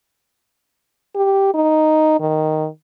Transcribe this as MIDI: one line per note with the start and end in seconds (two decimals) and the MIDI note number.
1.16 1.52 67
1.54 2.20 63
2.20 2.67 51